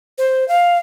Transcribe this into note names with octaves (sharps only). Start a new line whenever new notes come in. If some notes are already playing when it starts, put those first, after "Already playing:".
C5
F5